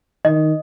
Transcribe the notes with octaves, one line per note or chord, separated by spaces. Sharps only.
D#3 D#5